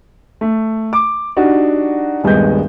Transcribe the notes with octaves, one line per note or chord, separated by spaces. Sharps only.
A3
D6
D4 D#4 F#4 G4
D#1 G2 G#3 B3 D#5 G6